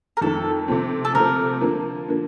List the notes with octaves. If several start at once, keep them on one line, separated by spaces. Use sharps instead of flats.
A#4
F2 D#3 A3 A4
C3 F3 A3 C4
A4
C3 F3 A3 C4 A#4
D3 F3 A#3
D3 F3 A#3